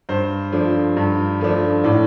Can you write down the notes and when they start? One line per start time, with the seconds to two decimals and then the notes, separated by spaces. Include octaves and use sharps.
0.09 G2 C5
0.52 F3 A3 D4
0.97 G2
1.41 F3 A3 D4
1.84 A2 D5